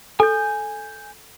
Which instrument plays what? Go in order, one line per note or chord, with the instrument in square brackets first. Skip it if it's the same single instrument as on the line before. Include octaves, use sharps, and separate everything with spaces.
[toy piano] A4 [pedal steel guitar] G#5 G6